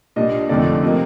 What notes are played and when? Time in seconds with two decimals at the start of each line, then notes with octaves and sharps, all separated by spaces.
0.16 A#2 G3 D4 D#5
0.49 F2 D3 A3 D#4 D5
0.82 C3 F3 A#3 D#5